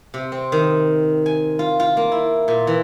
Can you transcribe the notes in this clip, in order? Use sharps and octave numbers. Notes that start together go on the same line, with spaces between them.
C3
C4
D#3
G#5
F4
F4
A#3
E4
A#2
E3